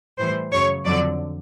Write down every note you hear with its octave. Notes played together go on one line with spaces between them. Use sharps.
A2 E3 G3 C5
F#2 C#3 F#3 C#5
F2 D3 F#3 D5